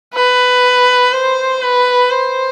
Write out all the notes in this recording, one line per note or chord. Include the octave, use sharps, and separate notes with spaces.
B4
C5
B4
C5